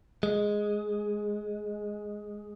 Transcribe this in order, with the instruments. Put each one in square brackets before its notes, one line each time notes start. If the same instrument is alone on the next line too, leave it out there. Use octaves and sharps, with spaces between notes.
[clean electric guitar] G#3